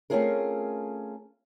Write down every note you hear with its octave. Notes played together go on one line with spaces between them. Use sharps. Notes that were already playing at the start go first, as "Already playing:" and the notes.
A3 C4 C#4 F4 G#4 A#4